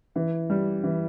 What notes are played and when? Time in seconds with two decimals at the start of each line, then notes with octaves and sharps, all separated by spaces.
0.16 E3
0.50 G3
0.83 E3